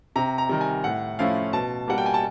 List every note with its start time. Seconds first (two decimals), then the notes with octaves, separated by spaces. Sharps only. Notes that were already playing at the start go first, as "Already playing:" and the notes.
0.16 C3 A#5
0.38 A#5
0.49 D#3 G3
0.61 G#5
0.84 A2 F#5
1.19 F3 A3 C#4 E4 F5
1.53 B2 A5
1.88 G3 A#3 F#5
1.98 G5
2.06 G#5
2.14 A5